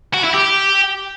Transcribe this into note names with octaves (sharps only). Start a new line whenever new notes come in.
F#4
E4
G4